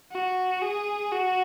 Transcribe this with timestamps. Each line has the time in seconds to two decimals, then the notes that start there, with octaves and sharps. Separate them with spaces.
0.12 F#4
0.62 G#4
1.12 F#4